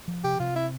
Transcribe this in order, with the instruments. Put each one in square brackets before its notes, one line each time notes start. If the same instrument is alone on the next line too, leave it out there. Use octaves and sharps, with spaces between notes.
[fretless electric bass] F3
[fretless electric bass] C3 [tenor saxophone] G4
[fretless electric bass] C3 [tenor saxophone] F4
[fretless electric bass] C4 [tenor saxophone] E4